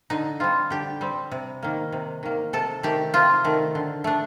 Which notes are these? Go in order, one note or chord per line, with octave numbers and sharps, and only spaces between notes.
D3 D#4
G3 C4 F4
D3 G4
G3 C4
C3
D#3 A#3
C3
D#3 A#3
C3 A4
D#3 A3 G4
C3 F4
D#3 A3
D3
A3 D4